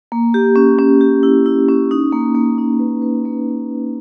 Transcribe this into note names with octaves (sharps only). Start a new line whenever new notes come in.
A#3
G4
C#4
C#4
G4
E4
E4
C#4
D#4
A#3
A#3
D#4
B4
B4
A#3